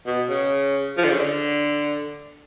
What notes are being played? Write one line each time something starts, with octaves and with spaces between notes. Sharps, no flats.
B2
C#3
F3
D3
C#3
D3